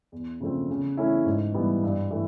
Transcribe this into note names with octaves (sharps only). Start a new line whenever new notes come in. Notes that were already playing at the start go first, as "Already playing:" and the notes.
E2
C#3 F3 A3 C4
C#3
E3 A3 C#4 E4
G#2
E3 G3 B3
G2
E3 A3